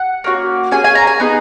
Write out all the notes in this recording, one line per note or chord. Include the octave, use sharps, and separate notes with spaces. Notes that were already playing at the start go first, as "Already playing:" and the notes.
Already playing: F#5
A#3 C#4 F#4
C#4 G#4 G#5
G#5
A#5
G#5
B3 D#4 G#4